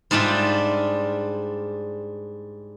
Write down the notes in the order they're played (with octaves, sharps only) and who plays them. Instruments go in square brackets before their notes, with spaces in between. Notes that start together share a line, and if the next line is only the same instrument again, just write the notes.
[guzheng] G#2 G3 D4 F4 E5